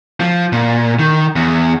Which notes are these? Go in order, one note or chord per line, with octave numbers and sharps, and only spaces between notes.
F3
A#2
D#3
E2